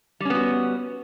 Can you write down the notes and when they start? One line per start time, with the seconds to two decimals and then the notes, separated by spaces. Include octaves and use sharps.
0.20 G3
0.25 C#4
0.30 B3
0.35 F#4